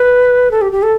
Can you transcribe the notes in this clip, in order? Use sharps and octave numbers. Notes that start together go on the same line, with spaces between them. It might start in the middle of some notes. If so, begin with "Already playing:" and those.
Already playing: B4
A4
G4
G4
A4